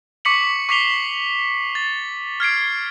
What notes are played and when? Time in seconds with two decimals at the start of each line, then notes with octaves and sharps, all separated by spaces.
0.25 C#6 D6 B6 C#7 F#7
0.69 C#6 D6 B6 C7 F7 G7
1.75 A6
2.40 F6 G#6 C7 D7